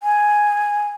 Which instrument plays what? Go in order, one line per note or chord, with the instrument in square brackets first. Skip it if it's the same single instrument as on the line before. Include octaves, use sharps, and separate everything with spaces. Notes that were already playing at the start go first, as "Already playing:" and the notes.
[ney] G#5